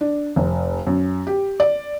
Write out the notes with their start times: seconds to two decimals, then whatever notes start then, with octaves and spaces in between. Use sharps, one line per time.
0.01 D4
0.36 F1
0.87 F#2
1.27 G4
1.60 D5